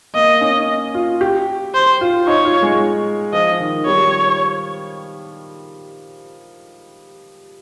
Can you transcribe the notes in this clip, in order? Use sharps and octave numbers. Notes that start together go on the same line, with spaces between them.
A#3 D#5
C#4
F4
G4
C5
F4
D#4 C#5
F4
G#3
F3 D#5
D#3
G3 C#5